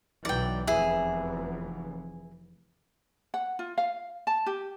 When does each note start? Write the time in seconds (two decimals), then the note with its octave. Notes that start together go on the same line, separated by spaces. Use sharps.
0.25 B1 E3 F#3 D5 G5
0.67 F1 E2 E3 E4 G#4
3.34 F#5
3.59 F4
3.78 F5
4.27 A5
4.46 G4